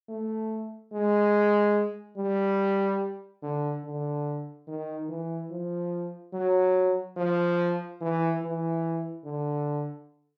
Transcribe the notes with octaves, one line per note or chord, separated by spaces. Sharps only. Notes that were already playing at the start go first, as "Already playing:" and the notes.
A3
G#3
G3
D3
D3
D#3
E3
F3
F#3
F3
E3
E3
D3